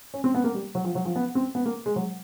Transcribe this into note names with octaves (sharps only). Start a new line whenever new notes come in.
C#4
C4
B3
A#3
G3
F#3
F3
F#3
F3
B3
C4
B3
A#3
G#3
F#3